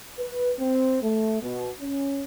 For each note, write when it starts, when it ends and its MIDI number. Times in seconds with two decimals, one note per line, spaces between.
0.19 0.52 71
0.59 0.98 60
1.03 1.40 57
1.42 1.70 47
1.80 2.24 61